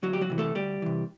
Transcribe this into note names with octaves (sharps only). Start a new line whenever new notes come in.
D2 F#3 F#4
G4
F#3 F#4
C3 E3
A3 A4
D2 G3 G4
C3 E3